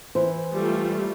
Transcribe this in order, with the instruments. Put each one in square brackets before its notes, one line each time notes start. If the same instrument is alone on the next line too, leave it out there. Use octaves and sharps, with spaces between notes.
[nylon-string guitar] E3 C5
[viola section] G3 A3 F4